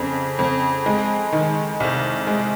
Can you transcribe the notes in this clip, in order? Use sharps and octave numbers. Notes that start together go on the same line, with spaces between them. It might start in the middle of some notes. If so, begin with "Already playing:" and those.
Already playing: F2 C#3
F2
G#3
D#3
C2
G#3